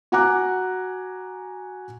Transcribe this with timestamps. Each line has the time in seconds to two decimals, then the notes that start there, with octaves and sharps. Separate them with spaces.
0.12 F#4 F#5 G#5 A#5 D6 F#6